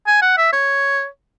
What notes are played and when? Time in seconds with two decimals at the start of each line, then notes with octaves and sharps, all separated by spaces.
0.07 G#5
0.22 F#5
0.37 E5
0.53 C#5